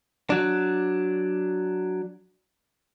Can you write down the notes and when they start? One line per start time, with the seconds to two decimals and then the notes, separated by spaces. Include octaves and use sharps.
0.30 F#3 D4